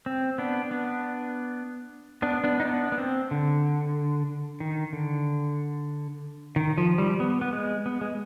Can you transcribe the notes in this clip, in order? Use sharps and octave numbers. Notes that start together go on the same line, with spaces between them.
C4
B3 D4
B3 D4
B3 D4
B3 D4
D#4
B3 D4
B3
C4
D3
D#3
D3
D#3
F3
G3
B3
B3
G#3
B3
G#3